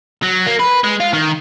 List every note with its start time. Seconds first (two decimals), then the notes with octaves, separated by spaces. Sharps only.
0.23 F#3
0.46 A#3
0.59 B4
0.84 G#3
1.00 F4
1.13 D#3